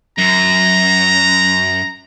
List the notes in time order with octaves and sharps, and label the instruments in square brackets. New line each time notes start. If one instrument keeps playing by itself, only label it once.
[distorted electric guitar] F#2 [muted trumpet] A#5